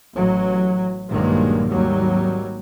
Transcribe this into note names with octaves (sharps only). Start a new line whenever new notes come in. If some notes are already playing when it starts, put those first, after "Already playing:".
A1 F#3
A#1 G2 D#3 F#3 G#3 A#3
G#1 D#2 F#3 G3